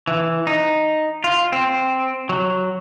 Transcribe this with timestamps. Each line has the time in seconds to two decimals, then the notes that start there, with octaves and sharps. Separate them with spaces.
0.07 E3
0.47 D#4
1.24 F4
1.52 C4
2.29 F#3